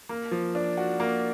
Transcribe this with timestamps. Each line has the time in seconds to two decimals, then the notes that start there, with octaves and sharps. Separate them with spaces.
0.09 A#3
0.31 F3
0.55 D4
0.78 F#4
1.00 A#3